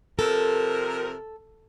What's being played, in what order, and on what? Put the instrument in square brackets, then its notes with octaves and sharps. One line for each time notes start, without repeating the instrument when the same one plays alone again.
[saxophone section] C3 F3 A#4 [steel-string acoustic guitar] A4